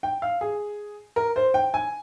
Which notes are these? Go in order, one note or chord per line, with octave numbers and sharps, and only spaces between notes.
G5
F5
G#4
A#4
C5
G5
G#5